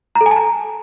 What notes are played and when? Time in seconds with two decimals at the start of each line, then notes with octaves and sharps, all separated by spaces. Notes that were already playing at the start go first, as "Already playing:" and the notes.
0.15 A#5
0.21 A4
0.26 G#5
0.31 A5
0.36 A#5